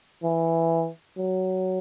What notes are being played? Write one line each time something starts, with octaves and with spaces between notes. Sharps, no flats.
E3
F#3